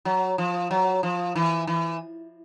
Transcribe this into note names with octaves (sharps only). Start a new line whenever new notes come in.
F#3
F3
F#3
F3
E3
E3